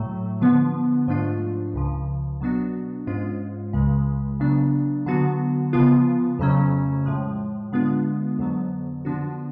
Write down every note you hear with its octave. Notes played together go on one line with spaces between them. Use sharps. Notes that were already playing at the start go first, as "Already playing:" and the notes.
Already playing: A2 F#3 A3
D3 F3 B3
G#2 F3 A3 D4 F4
C#2 C#3 F3
B2 F#3 B3 D4 F#4
G#2 G#3 C#4 F4
C#2 C#3 G#3
C#3 F#3 B3 D4
D3 F#3 B3 F#4
C#3 F3 B3 F4
F2 C#3 F#3 A3 C#4
A2 F3 G#3
D3 G#3 B3 D4 F4
F2 D3 F#3 B3
D3 F3 B3 D4 F#4